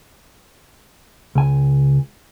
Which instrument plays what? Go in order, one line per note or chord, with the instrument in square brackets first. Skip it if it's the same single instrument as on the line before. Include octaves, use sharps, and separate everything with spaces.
[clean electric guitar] C#2 G#5